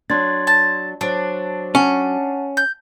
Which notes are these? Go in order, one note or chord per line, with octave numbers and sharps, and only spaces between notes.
F#3 D4 C6 G#6 A6
A5
F#3 D4 C5 A5
C#4 F#5 A5
G6